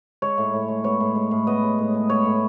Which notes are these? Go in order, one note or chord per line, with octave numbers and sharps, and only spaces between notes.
G#3 C#5
A2
A2
G#3
B3 C#5
A2
G#3
A2
B3 D#5
G#3
A2
G#3
B3 C#5
A2